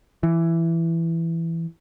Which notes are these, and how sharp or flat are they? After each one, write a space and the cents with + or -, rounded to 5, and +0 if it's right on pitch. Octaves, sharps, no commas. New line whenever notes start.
E3 +10